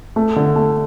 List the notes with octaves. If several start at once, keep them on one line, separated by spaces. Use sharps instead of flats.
A3
D3
A3